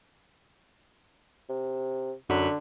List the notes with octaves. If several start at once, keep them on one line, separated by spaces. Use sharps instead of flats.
C3
F#2 D3 F#3 B5